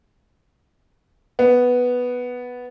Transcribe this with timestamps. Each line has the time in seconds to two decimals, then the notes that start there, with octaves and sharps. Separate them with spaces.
1.39 B3